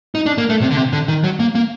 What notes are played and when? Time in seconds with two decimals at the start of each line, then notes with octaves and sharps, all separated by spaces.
0.15 D#4
0.26 D4
0.38 A#3
0.50 A3
0.61 C3
0.71 D3
0.77 C3
0.93 D3
1.08 D#3
1.24 F#3
1.40 A#3
1.55 A#3